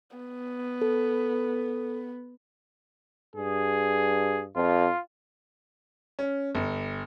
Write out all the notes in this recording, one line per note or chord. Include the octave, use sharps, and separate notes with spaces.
B3
A4
G2 G#4
F2 F4
C#4
G1